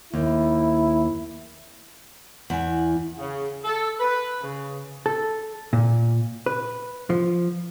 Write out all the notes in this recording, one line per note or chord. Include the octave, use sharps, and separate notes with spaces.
D#2 E4
E2 F#5 G#5
C#3
A4
B4
C#3
A4
A#2
B4
F3